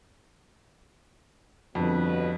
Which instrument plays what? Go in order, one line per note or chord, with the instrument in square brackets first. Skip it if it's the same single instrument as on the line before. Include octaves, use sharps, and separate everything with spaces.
[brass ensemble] G1 B2 B4 [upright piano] F2